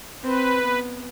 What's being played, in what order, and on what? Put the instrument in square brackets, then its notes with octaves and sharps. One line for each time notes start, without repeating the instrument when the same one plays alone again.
[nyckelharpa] C4 [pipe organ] B4
[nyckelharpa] B3